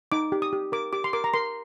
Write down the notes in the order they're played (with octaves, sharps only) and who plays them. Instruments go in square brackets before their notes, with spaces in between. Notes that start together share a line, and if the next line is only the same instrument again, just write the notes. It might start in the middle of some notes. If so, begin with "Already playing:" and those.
[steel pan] D#4 D6
G4
D#6
G4
A#4 D6
G4 D6
C6
A#4 D6
A#5
A#4 C6